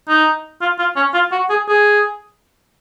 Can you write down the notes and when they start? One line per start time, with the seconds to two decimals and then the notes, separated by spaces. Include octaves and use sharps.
0.09 D#4
0.61 F4
0.79 F4
0.96 C#4
1.14 F4
1.32 F#4
1.50 G#4
1.68 G#4